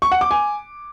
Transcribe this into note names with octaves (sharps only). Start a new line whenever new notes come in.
C#6
F#5
D6
G#5